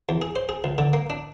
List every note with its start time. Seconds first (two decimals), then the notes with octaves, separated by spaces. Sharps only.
0.09 E2
0.22 G#4
0.36 C5
0.49 G#4
0.64 C#2
0.78 D3
0.93 A#3
1.10 D4